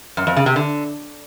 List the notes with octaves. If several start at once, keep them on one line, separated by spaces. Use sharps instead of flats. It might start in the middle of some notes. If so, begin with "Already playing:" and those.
F#2
F2
C#3
C3
D3